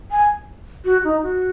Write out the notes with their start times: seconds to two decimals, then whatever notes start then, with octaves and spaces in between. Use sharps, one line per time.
0.11 G#5
0.85 F#4
1.04 D#4
1.23 F#4